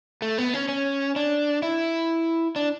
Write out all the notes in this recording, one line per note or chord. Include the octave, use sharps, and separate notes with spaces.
A3
B3
C#4
C#4
D4
E4
D4